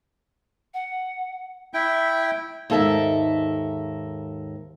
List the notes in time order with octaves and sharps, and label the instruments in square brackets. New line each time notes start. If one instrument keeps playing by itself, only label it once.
[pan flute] F#5
[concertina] E4 G5 [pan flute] E5
[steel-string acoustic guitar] D#2 G#2 A4 A#4 E5